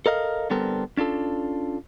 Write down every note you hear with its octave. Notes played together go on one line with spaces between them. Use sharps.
A4 A#4 D#5 F5
D3 G3 B3 C4 A4 A#4
C#4 D4 F4 A4